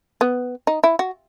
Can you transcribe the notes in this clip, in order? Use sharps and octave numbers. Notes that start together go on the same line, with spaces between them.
B3
D#4
E4
F#4